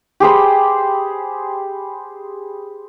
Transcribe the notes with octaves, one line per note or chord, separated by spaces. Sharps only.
G4 G#4 C5 B5